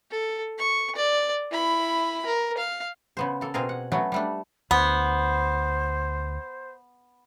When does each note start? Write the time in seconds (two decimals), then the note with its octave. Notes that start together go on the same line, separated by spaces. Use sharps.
0.11 A4
0.58 C#6
0.95 D5
1.51 E4 B5
2.26 A#4
2.57 F5
3.17 C#3 B3 C5
3.41 A#3 A4
3.54 B2 C4 F4 G#4 A#4
3.69 F#5
3.92 F#3 A3 B3 C#4 F#4
4.12 G3 A3 D4
4.71 D2 B3 C5